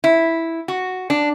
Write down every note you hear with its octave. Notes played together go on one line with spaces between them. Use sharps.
E4
F#4
D4